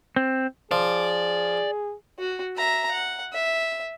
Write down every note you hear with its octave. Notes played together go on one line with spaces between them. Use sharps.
C4
F3 G#4 D5
F#4
E5 A#5
F#5
E5